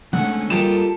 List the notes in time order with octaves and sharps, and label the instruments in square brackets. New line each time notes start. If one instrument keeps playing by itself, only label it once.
[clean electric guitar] D3 G#3 A3 [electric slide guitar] C4 C#4 G#5 [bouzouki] F#5
[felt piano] G3 A#3 E7 [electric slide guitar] F4 [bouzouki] G4 A4 [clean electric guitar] A#4 D#5